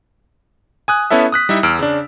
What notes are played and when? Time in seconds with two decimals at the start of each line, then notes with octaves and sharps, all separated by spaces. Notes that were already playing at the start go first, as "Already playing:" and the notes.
0.88 G#5 D#6 F#6
1.11 B3 C#4 E4 A4 E5
1.32 D#6 F#6 B6
1.49 G3 D#4 E4 E5
1.63 E2 E6 F6 D7
1.79 C#3 D4